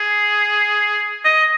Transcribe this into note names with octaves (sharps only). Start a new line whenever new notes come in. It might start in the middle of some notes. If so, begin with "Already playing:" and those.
Already playing: G#4
D#5